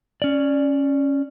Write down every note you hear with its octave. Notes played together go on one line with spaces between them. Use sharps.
C#4 D5